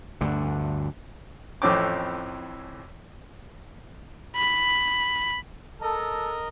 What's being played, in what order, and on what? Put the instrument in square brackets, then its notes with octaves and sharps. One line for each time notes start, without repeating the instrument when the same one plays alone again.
[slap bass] D2 G2 D3
[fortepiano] F2 A2 E3 C4 C#4 D6
[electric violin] B5
[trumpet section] A4 [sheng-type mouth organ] A#4 D#5